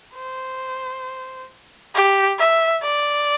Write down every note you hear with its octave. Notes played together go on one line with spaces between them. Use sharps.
C5
G4
E5
D5